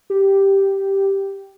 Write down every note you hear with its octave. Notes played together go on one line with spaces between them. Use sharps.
G4